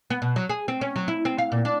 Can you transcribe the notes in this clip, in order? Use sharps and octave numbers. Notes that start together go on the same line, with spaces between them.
B3
B2
F#3
G#4
C4
C#4
F#3
E4
C4
F5
A#2
D4